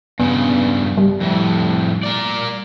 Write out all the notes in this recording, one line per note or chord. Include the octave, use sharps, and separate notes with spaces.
G2 C#3 B3
G3
F2 A2
A#4 D5